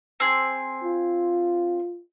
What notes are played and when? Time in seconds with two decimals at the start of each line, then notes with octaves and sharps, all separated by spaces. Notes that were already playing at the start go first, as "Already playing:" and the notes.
0.20 C4 G#4
0.84 F4